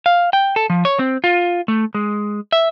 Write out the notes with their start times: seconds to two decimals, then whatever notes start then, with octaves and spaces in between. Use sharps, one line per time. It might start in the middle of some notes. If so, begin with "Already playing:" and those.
0.06 F5
0.33 G5
0.56 A4
0.70 F3
0.85 C#5
0.99 C4
1.24 F4
1.68 A3
1.95 G#3
2.52 E5